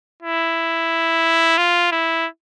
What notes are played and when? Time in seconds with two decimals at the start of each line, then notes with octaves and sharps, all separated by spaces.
0.23 E4
1.58 F4
1.92 E4